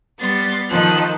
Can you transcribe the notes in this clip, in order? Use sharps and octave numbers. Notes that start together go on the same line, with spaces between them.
G3 B3 C6 A6
D#3 F3 A4 F#6